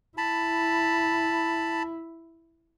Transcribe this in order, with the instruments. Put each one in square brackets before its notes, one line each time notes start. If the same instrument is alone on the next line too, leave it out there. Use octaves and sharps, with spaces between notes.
[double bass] E4 [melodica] A5 B5